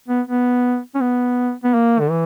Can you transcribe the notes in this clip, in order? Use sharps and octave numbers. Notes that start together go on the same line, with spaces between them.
B3
B3
C#4
B3
B3
A#3
D3
E3